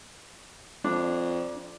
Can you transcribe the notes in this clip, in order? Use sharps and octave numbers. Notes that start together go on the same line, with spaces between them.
F2 D4